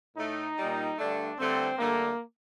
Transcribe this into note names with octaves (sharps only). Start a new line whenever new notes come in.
A2 A3 D#4
A#2 G3
G2 D3 A3 D4
G2 D3 A3 C4
G2 D3 A3 A#3